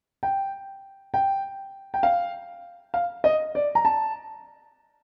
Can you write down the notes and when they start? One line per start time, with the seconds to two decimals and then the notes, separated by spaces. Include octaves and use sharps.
0.23 G5
1.14 G5
1.94 G5
2.03 F5
2.94 F5
3.24 D#5
3.55 D5
3.75 A#5
3.85 A5